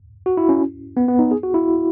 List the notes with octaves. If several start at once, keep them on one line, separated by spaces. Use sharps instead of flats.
F#4
E4
C#4
B3
B3
D#4
G#4
F#4
E4